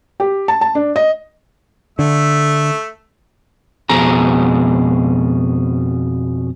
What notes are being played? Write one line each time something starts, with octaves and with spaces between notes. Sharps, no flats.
G4
A5
A5
D4
D#5
D3 A3 E5
F2 B2 G#4 A#5